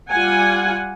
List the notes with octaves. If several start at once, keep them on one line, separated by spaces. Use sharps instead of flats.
G3 F4 F#5 G#5